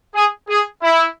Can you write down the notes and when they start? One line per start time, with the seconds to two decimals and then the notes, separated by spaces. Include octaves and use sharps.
0.15 G#4
0.49 G#4
0.83 E4